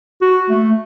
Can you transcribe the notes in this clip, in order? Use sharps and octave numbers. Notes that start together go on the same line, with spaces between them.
F#4
A3